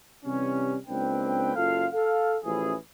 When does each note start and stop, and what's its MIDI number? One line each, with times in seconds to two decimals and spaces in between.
0.24 0.75 48
0.24 0.75 52
0.24 0.75 55
0.24 0.75 61
0.87 1.53 37
0.87 1.53 58
0.87 1.53 60
0.87 1.53 62
0.87 1.53 71
0.87 1.53 79
1.55 1.86 30
1.55 1.86 42
1.55 1.86 65
1.55 1.86 69
1.55 1.86 77
1.93 2.35 69
1.93 2.35 77
2.44 2.73 33
2.44 2.73 52
2.44 2.73 53
2.44 2.73 61
2.44 2.73 64
2.44 2.73 68